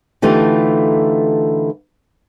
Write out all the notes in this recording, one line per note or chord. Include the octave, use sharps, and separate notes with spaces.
D3 E3 A3 D#4 F4 G4